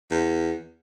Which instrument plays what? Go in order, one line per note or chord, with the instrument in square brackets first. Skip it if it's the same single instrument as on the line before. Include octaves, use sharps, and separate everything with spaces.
[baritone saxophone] E2